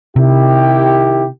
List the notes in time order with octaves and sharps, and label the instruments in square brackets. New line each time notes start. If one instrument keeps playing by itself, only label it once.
[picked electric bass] C3 [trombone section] D#3 E4 G4